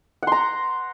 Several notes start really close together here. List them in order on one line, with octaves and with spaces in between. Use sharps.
F#5 C6 A#5